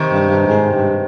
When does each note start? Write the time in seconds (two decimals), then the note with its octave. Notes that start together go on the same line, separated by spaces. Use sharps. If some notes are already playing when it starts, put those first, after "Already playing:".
Already playing: C3 D#3
0.12 G2
0.29 G2
0.47 G#2
0.74 G2